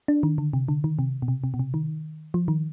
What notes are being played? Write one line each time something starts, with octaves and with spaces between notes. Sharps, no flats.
D4
D#3
D3
C3
D3
D#3
C3
B2
C3
C3
B2
C3
D#3
F3
D#3